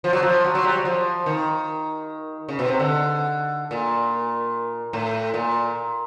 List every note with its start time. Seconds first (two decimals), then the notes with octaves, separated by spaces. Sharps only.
0.04 F3
0.13 F#3
0.23 F3
0.45 F#3
0.55 F#3
0.65 G3
0.75 F#3
0.85 F3
1.26 D#3
2.49 C#3
2.59 B2
2.68 C3
2.79 D3
3.71 A#2
4.93 A2
5.34 A#2